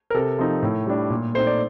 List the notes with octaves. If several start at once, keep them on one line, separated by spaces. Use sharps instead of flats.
A#4
C3 A4
F3 C4 D#4
A2
G3 D4
A#2
A3 C4 D#4 C5
D5